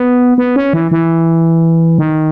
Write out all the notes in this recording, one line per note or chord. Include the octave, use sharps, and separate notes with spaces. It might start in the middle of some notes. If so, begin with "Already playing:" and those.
Already playing: B3
B3
C#4
E3
E3
D#3